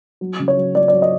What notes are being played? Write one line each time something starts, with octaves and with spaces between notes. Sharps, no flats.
F#3
C#3
C#5
F#3
F#3 D5
F#3 D5
D#5